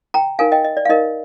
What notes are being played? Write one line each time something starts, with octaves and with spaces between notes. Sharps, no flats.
G5 A#5
D#4 A#4 F5 G#5
D#5 G5
D#5
D5
F5
D#4 A#4 D#5